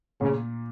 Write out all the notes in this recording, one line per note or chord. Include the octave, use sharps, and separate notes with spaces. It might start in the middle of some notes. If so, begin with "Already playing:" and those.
A#2 C#3